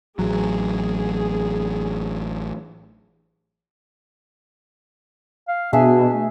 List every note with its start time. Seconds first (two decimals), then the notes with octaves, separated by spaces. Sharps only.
0.19 A1 F#3 G#4
5.48 F5
5.73 B2 D4 G#4 E5
6.13 A3